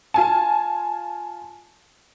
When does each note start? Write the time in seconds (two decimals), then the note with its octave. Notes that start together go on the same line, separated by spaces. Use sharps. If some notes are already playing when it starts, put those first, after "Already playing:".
0.14 F4 G#5 A5